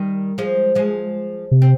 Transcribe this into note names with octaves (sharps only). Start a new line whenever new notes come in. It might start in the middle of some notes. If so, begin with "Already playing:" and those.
Already playing: D#3 G3
F3 G#3
F3 G#3
C3
C4